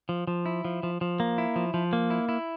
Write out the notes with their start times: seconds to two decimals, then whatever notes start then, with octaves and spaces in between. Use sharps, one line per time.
0.09 F3
0.27 F3
0.46 E4
0.65 F3
0.83 F3
1.01 F3
1.20 A#3
1.38 E4
1.56 F3
1.74 F3
1.93 A#3
2.10 E4
2.29 E4